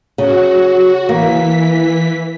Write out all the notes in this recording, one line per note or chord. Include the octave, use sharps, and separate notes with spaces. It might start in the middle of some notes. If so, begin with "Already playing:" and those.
C#3 F#4
E3 A#3 B6